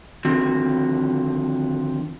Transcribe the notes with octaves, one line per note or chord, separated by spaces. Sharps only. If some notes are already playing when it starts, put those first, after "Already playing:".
D3 D#3 F3 C4 F#4